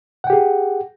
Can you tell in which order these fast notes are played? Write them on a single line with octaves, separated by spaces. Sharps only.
F#5 G5 G4 G#4